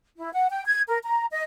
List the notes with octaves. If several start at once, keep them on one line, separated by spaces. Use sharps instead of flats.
E4
F#5
G5
G#6
A#4
A#5
D#5